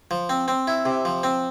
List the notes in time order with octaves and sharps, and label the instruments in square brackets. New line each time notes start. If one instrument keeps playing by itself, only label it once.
[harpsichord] F3
C4
C4
E4
C3
F3
C4